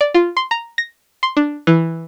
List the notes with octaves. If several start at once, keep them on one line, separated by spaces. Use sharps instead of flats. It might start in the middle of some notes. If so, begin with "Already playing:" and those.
D5
F4
C6
A#5
A#6
C6
D4
E3